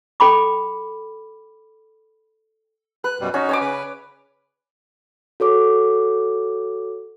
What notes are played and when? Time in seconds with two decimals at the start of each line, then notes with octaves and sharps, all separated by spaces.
0.20 A4 G5 B5 D6
3.04 B4 F#6
3.20 F#2 B2 G3
3.34 C#4 D#4 F#4
3.49 C#5 G#5 D6
3.61 C#3 B4
5.40 F#4 A4 C#5 D6